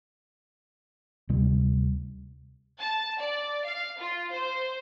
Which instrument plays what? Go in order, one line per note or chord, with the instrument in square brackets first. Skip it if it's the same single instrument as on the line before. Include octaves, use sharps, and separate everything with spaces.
[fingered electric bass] D2 C3 G3
[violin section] A5
D5
F5
F4
C5